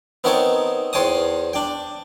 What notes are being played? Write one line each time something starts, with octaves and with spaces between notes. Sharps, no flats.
B3 C4 D#4 A#4 C#5 A5
E2 C5 C#5 G5 A5 D#6
D4 G5